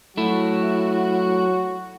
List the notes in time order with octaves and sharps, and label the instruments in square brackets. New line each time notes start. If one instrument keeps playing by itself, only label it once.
[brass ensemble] F#3 F#4 [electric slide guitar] A3 E4